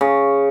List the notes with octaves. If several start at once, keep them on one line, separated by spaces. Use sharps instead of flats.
C#3